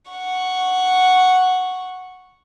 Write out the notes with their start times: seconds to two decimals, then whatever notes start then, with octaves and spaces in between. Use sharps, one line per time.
0.10 F#5 C#6